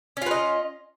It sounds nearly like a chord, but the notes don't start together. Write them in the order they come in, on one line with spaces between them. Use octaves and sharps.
C#4 F4 B4 D#5